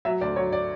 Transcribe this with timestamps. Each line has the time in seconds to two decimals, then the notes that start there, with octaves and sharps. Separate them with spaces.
0.05 F#3 E5
0.21 D2 D5
0.36 F#3 C#5
0.53 D5